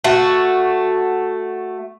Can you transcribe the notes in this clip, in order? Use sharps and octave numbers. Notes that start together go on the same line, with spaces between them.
A3 F#4